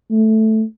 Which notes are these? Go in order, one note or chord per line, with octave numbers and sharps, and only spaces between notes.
A3